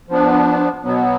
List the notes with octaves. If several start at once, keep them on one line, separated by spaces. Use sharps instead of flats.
F3 B3 D4
B2 F#3 B3